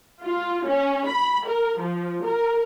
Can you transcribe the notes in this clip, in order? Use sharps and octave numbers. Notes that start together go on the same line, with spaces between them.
F4
C#4
B5
A#4
F3
A#4